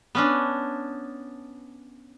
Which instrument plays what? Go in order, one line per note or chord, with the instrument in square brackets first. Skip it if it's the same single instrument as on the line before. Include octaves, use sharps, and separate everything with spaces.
[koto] B3 C#4 D4